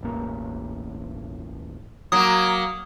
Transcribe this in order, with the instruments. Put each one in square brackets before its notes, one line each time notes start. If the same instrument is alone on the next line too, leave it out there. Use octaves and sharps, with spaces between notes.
[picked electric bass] E1 A1 A#3
[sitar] F#3 A#3 [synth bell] D#6